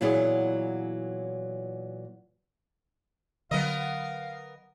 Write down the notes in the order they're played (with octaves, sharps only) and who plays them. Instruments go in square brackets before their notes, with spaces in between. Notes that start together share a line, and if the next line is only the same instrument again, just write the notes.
[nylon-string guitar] A#2 E3 F#3 B3 E4 G#4
[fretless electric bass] D3 F#3 [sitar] B3 A#4 D#5 [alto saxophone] F5